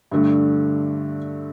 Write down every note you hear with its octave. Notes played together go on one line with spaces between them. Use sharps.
G2 D3 A3